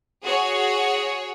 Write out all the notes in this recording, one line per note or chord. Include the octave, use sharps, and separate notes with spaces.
F#4 G#4 C#5